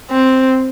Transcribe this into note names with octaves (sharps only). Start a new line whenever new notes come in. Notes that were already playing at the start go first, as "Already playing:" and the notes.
C4